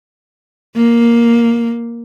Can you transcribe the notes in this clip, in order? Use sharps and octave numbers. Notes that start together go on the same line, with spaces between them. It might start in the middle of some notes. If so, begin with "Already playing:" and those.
A#3